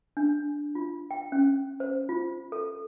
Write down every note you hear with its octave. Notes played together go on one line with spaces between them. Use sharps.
D4
F4
G5
C#4
C5
F4
A4